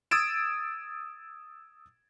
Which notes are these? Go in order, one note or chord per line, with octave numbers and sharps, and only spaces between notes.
D#6 E6 G#6 A6 D7 E7